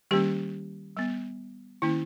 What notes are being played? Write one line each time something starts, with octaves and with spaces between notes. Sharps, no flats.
D#3 G3 A#3 C#4 G4
G3 B3
D#3 A#3 C#4 E4